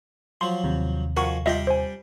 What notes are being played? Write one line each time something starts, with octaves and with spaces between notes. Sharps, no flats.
F3 F#3 C6
D#2 C3
F2 F#4 A#4 F#5 G#5 C#6
G3 D4 F4 G4 D#5 E5
C5 G#5